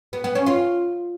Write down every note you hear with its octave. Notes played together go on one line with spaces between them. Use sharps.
B3
B3
C#4
F4